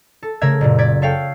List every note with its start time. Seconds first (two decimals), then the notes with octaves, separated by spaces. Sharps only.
0.23 A4
0.41 C#3 A3 A#4 E5 G#6
0.61 F#1 A#2
0.78 D5 G#6 B6
1.02 A4 C#5 E5 F5 G5